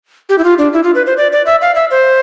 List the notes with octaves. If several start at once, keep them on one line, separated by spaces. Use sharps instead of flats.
G4
E4
F4
D4
E4
F4
B4
C5
D5
D5
E5
F5
E5
C5